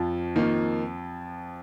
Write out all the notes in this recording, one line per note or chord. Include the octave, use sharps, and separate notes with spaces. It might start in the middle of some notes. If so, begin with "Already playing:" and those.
Already playing: F2 F3
D#3 A#3 F4